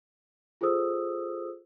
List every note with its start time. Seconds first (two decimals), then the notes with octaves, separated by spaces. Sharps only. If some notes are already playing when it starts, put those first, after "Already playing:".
0.61 F4 G#4 A4 C5 D#6 E6